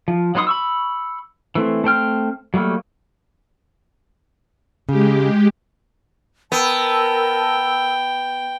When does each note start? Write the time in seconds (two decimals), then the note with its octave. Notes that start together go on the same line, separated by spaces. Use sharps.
0.08 F3
0.35 F#3 B3 D#4 C6 D#6
0.47 B5 C#6 E6
1.55 E3 A3 C4
1.84 A3 C4 G5 F6
2.54 F#3 G3 A3 A#3
4.89 C#3 G#3 G4
6.52 B3 A#4 G5 A5 E6